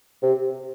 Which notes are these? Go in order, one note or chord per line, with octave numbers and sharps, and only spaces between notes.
C3